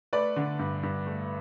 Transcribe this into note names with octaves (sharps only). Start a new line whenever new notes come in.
A3 B4 D5
D3
G2
G2
A3